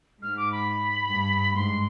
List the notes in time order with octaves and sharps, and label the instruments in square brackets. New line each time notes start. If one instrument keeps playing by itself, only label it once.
[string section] G#2 [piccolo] F6
[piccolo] D6
B5
[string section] G2
[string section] G#2 [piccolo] C6